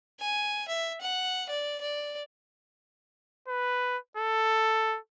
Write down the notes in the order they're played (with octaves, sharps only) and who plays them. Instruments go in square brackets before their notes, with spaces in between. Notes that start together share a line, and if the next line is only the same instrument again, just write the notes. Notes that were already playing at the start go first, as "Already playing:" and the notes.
[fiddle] G#5
E5
F#5
D5
D5
[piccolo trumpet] B4
A4